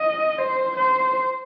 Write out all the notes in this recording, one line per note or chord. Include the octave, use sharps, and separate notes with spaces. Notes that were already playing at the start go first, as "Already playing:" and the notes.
Already playing: D#5
C5
C5